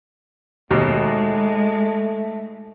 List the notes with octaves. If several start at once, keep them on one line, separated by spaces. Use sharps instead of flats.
D#2 B2 G#3 A3